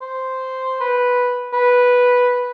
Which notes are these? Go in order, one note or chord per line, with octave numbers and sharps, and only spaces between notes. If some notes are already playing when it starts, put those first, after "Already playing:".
C5
B4
B4